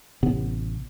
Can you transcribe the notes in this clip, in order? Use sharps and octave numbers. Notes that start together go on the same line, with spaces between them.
A1 C3 B3